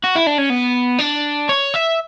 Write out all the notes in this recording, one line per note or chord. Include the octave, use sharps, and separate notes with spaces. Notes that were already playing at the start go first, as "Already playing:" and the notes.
F#4
E4
D4
C#4
B3
D4
C#5
E5